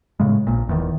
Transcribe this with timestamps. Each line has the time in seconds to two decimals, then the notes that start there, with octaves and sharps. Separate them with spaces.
0.20 A2 C#3 G#3
0.47 A#1 A#2
0.67 F1 E2 D#3